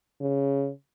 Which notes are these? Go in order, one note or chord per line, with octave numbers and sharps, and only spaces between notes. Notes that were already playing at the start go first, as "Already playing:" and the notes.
C#3